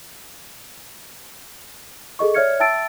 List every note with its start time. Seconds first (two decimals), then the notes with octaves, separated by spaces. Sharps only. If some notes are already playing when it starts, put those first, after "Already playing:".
2.19 G#4 A4 D#5 C#6
2.34 C#5 D5 E5 F6 G#6 C#7
2.60 E5 G5 A5 E6 A6 D7